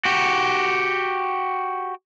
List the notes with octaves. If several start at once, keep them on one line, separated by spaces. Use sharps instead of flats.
F#4 G4